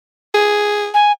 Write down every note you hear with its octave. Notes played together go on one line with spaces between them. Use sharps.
G#4
G#5